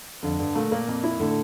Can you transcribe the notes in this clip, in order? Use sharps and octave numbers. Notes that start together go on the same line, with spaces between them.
F2 D3
G2 D3
A#2 A3
A#2 A#3
F2
E4
A2 D3